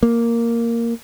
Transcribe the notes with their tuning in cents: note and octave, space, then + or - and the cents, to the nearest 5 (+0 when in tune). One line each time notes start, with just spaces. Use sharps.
A#3 -5